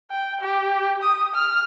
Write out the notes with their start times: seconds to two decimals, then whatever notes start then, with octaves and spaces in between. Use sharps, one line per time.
0.11 G5
0.41 G4
1.02 D#6
1.34 F6